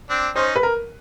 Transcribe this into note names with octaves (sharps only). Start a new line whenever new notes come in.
C4 D4
C#4 D#4 C5
B4
A#4